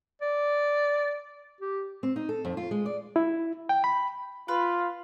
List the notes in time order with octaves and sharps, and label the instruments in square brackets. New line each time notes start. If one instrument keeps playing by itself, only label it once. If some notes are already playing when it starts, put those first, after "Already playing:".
[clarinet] D5
G4
[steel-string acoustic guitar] C4
D#4
A4
F2
F4
G#3
D5
[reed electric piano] E4
G5
B5
[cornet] F4 [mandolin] B4